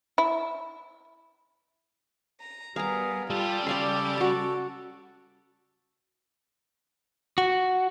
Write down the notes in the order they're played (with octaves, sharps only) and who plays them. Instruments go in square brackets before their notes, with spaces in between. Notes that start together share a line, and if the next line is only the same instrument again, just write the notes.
[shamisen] E4
[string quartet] A#5
[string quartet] G3 B3 [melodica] G#4 A#4 [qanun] F5 A#5
[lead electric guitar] G3 G4 [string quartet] F4 [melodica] A4
[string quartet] C#3 C#4 D6 [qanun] D5 F5 C6
[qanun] F#4 A5
[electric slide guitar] F#4